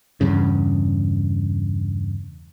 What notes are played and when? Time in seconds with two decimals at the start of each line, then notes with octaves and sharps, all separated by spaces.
0.21 E2 G2 C#3